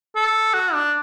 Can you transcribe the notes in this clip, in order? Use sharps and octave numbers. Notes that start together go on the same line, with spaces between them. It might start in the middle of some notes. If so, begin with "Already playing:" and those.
A4
F#4
D4